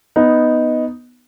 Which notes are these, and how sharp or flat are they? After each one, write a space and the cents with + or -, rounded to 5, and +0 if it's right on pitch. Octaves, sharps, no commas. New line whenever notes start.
B3 +0 D#4 +0